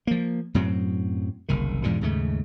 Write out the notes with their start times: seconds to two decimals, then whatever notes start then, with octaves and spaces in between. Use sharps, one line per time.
0.07 F3 A#3
0.54 F#2 A2 F#3 C4
1.49 F#1 C2 D#3
1.83 E2 G#2 B2 D3
2.01 D#2 G#2 C#3 A3